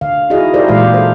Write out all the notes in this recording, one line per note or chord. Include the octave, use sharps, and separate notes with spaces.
D3 F5
D#4 E4 F#4 G#4 D#5
E4 G4 G#4 A#4 C5 D5
A#2 E3 G#3 C5 F5
A4 C5